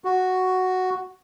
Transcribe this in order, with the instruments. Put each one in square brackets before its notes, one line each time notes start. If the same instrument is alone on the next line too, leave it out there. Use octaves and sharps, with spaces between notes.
[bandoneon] F#4